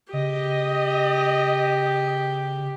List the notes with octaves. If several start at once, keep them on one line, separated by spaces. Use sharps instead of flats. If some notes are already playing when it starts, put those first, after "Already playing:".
C#3 G4 D#5